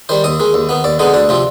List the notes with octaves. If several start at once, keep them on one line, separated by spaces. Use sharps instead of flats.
D#3 G3 C5
D#2 D#5
D#3 G#3
D#2
D#3 B3
D#2 D5
D3 G#3 B3 D#4
D2 D4
C3 F3 C4